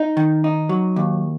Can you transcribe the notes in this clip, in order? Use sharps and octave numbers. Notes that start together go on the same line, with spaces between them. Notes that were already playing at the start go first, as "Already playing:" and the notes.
Already playing: D#4
D#3
D#4
F#3
D#2